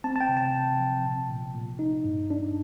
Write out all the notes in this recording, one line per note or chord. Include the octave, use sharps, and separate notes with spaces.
C4 A5
A5
G5
C3
A5
C3
F3
A#2
A#2
A#2
D#4
G2
D4